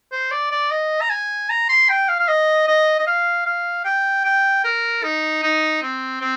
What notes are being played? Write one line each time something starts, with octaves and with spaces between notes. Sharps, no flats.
C5
D5
D5
D#5
A#5
G#5
A#5
C6
G5
F5
F5
D#5
D#5
D#5
F5
F5
G5
G5
A#4
D#4
D#4
C4
C4